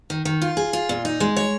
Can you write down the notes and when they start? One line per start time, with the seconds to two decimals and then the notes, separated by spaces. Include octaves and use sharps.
0.10 D#3
0.25 D#3
0.41 F4
0.57 G#4
0.73 F4
0.89 A#2
1.05 D#4
1.20 G#3
1.37 C#5